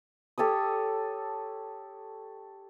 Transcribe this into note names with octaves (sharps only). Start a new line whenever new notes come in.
G4 A4 C#5 D#6